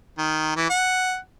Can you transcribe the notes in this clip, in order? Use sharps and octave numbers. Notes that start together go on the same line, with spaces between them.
D#3
E3
F#5